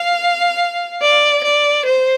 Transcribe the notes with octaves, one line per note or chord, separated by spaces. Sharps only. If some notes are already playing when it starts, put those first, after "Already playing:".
Already playing: F5
D5
D5
C5